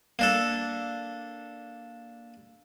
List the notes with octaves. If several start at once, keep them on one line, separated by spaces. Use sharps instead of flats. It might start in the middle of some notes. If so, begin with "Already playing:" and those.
A#3 D4 A4